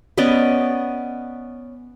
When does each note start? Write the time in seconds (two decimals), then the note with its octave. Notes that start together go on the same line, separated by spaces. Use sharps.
0.18 B3 C#4 D5 D#5